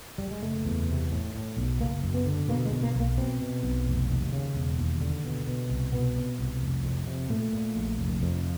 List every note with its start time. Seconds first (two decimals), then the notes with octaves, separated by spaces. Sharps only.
0.18 G3
0.31 G#3
0.42 F#1 A3
0.65 E2
0.88 C3
1.11 A2
1.35 A2
1.57 B1
1.80 F#1 A#3
2.03 F#2
2.14 B3
2.26 D3
2.48 B2 A#3
2.65 G#3
2.71 B2
2.83 A#3
2.94 B1
3.00 A#3
3.17 B2 C4
3.41 B2
3.63 B1
3.87 F1
4.10 D#2
4.33 C#3
4.55 E1
4.78 D#2
5.01 D3
5.24 B2
5.47 B2
5.69 C2
5.92 B2 B3
6.16 B2
6.39 C2
6.61 F1
6.84 F2
7.07 C3
7.29 A#2 A3
7.53 A#2
7.75 A#1
7.99 F1
8.22 F2